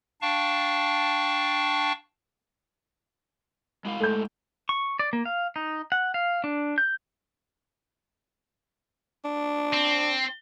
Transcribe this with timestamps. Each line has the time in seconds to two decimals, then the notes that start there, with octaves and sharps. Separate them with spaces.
0.22 D4 F5 G5 A5 C#6
3.85 G#3 E4 F5
4.00 A2 G#3 A3 G6
4.69 C#6
4.99 D5
5.13 A#3
5.26 F5
5.56 D#4
5.92 F#5
6.14 F5
6.44 D4
6.78 G6
9.24 D4
9.73 C4